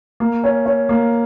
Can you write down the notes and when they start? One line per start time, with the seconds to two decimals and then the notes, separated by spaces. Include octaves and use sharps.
0.20 A#3
0.44 C#4
0.66 C#4
0.89 A#3